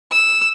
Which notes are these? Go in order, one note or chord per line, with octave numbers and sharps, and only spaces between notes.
E6